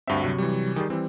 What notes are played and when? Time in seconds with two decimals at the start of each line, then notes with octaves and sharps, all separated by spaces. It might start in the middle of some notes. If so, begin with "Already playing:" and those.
0.07 D2 G2 C4 F#4 E5
0.23 C3 F#3 C#6
0.38 E3 G3
0.76 D#3 G3 G4 G#4
0.90 E3 G3 C4